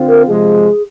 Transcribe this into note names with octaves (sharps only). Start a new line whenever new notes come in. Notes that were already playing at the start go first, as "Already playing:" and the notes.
Already playing: D3 C4 F4
A#4
C3 F3 G#3 G#4